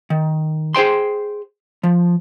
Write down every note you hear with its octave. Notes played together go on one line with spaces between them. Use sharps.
D#3
G#4 C5 G5 C6
F3